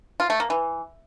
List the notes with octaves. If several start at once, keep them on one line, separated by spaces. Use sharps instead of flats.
F4
A3
A#3
E3